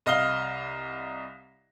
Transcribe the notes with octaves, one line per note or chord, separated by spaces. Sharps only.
C2 D#5 F5 F6 G7